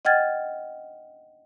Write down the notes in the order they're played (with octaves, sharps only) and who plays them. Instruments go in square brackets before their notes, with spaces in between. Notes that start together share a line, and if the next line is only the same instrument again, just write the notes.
[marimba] D#5 F#5 G5 F6 G#6 A6